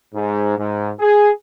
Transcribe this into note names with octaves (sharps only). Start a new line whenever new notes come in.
G#2
G#2
G#4